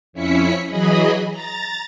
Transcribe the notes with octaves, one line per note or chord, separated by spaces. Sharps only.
F2 C#4 E4 B6 C#7
E3 F#3 G#4 D#5 B5
A#5 A6